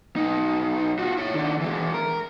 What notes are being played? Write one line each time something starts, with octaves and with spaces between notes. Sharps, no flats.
B1 D#4
F4 F#4
E4 C#5
D#3 D4
E3 G#3
A#4